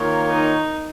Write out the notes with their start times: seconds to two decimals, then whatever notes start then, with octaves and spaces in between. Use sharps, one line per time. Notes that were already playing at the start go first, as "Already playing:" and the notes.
Already playing: D#3 A#3 F4 A#4 C#5
0.30 D#4